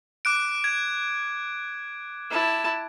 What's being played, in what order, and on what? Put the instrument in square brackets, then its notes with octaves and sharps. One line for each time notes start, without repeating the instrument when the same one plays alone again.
[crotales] D6 F#6 D7
G#6
[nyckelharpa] E4 A5